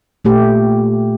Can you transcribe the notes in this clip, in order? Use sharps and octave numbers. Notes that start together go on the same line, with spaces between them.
A#2 A3 G4